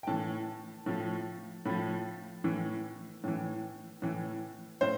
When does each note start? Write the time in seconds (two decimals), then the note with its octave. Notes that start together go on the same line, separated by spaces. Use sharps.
0.03 G5
0.07 A2 E3 A5
0.86 A2 F3
1.66 A2 F3 B5
2.44 A2 E3
3.24 A2 E3
4.02 A2 E3
4.81 A2 C5